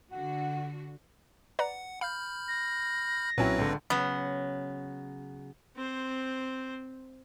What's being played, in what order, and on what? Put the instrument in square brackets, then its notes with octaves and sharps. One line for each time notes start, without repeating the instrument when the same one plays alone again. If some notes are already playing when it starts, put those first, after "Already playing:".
[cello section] D3 F#4 [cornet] F#5
[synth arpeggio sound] B4 D5 A#5 [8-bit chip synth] F#5
[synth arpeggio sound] F5 [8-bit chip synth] B5 F6 G6
[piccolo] A#6
[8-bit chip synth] B1 C4 B4 [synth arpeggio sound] A#2 G5 [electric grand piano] F#3 C#4 E4
[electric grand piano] C#2 D3 [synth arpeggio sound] A2
[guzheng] C#3 F#3 [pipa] B3
[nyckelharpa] C4 C5